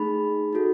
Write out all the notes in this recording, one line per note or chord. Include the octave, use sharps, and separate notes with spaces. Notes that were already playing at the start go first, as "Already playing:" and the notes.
Already playing: A3 D#4 G#4 B5
D#4 F#4 A4